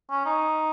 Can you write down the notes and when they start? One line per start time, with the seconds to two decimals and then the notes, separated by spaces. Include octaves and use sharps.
0.10 C#4
0.25 D#4